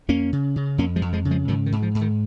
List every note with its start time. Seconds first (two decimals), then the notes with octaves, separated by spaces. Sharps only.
0.08 F2 A#3 C#4
0.33 C#3
0.56 C#3
0.78 F2 A#3 C#4
0.96 F3 G#3
1.02 F2
1.13 F3 G#3
1.25 C#3
1.31 F3 G#3
1.48 G#2 D#3 F#3
1.66 D#3
1.72 G#2
1.83 F3
1.95 G#2
2.01 D#3